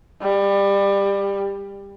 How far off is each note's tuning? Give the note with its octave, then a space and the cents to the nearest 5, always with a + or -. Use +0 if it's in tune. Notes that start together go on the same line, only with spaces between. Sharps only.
G3 +20